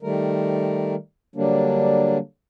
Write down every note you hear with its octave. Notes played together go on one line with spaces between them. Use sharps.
D#3 G3 A3 A#4
D3 F#3 G3 A#3 D4